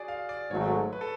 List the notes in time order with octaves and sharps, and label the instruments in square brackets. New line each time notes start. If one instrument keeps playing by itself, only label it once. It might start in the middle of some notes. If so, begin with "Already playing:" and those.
Already playing: [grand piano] F#4 G#4 D5
F5
D5
[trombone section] G#1 G#2 F#3 A3 [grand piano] C#5
[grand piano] B4
A4